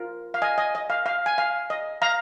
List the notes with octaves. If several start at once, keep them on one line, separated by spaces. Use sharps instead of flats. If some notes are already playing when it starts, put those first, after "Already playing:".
Already playing: F4 A#4
F5
D#5 G#5
D#5 G#5
D#5
F5
F5
G#5
F5
D#5
F5 A#5